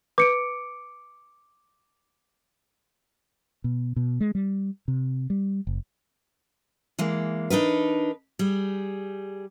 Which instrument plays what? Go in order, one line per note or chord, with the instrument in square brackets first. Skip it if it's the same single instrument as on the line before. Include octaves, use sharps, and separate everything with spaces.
[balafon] B4 [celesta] D6 C#7 D7
[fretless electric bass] B2
B2
G#3
G3
C3
G3
F#1
[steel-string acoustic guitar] E3 G#3 A#3
D4 D#4 A#4 B4
G3 G#4